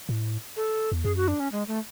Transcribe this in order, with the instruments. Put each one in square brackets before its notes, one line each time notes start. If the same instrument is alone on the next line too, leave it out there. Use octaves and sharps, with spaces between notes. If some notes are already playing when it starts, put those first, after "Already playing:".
[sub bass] A2
[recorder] A4
[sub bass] E2
[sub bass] F#2 [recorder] G#4
[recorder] F#4
D4
C#4
G#3
A3